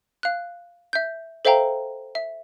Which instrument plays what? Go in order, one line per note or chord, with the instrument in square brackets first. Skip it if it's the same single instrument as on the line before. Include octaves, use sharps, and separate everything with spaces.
[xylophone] F5 F#6
E5 G6
A4 C5 E5 F5 G5 A#5
E5